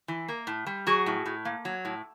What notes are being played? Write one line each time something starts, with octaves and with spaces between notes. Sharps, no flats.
E3
A#3
A2
G3
F#3 F#4 G#4
A2
A2
A#3
F#3
A2